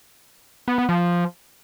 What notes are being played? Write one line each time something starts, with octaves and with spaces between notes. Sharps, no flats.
B3
B3
F3